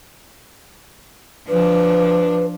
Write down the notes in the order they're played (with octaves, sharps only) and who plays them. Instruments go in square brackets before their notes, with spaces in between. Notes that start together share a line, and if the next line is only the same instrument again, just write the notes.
[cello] F3 D4 [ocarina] B4